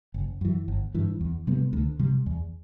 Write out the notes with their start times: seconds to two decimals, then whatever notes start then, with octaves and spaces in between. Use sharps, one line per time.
0.14 F#1
0.41 F#2 E3
0.68 G1
0.94 G2 E3
1.21 E2
1.47 C3 G3 B3
1.73 D2
1.99 C3 G3
2.26 E2